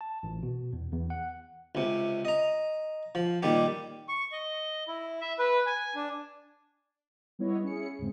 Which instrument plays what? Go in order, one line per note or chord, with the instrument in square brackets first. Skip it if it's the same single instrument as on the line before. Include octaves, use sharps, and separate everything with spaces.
[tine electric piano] A5
A1
B2
E2
E2
F#5
[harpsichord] C#2 C3
D#5 A#5
F3
A#2 D#3 G3 G4
[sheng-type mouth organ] C#6
D#5
E4
E5
B4
G#5
D4
[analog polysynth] G3 B3 E4 C#5 D#5
C#4 E4 G#4 C#7
D#2 G#2 C#3 G#3 C4